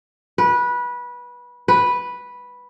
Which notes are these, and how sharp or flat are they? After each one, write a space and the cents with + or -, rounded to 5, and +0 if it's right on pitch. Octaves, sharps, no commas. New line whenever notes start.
B4 -20
B4 -5